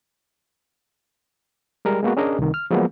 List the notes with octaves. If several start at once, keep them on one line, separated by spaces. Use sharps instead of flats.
G3 G#3 A#4
G#3 A#3 B3 F#4
C#4 D4 G#4 A#4 D#5
C2 D#3
F6
F3 F#3 G#3 A#3 B3